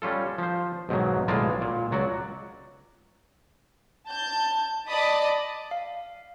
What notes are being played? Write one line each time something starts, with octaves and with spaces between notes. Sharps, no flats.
G3 C#4 F4 A4
F3 C5
B1 G#2 D#3 F#3
B1 A2 G#3 F4 D5 A5
A#2
C#2 F#3 F#4 D5
A5 G6
D5 D#5 A5 B5 D6 D#6
F5